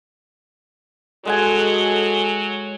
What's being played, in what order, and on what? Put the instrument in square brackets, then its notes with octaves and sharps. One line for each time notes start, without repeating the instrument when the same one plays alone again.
[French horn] F#3 [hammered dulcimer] G#3 F#5 G#5 [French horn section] F#4 G#4 A4